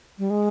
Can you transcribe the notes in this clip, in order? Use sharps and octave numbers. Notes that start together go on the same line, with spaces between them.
G3
G#3